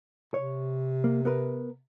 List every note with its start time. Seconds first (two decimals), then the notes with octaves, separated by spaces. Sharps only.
0.34 C3 C#5
1.04 A#3
1.25 B3 A#4 B4